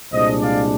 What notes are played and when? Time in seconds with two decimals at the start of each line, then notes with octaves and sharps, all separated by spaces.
0.12 C2 A#2 G#3 D4 C5 D#5
0.41 D5 F5